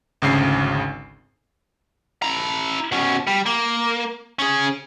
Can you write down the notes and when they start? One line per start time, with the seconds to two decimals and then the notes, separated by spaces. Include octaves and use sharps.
0.22 G#1 D2 C#3 C7
2.22 E4 A#5
2.92 B2 C#4
3.27 G3
3.46 A#3
4.39 C#4 G#4